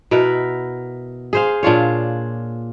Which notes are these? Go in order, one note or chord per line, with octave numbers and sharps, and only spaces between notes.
B2 E4 A#4 B4
G#4 C5 F5
A#2 D4 F4 C#5